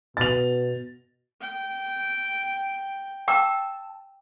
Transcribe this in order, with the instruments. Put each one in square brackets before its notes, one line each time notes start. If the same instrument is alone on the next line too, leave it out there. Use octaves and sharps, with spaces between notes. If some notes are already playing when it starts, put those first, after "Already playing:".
[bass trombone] B2 [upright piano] A6 F7
[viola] G5
[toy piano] G5 D6 [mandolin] A5 E6